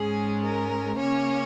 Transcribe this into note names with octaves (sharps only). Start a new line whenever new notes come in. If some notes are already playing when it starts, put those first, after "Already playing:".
Already playing: G#2 G#3 C#4 G#4
A#4
C#3 A#3 C#4 C#5